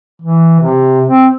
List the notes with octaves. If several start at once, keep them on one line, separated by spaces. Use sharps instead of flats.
E3
C3
C4